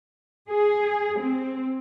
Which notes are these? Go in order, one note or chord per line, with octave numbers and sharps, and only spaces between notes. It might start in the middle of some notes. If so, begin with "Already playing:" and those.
G#4
C4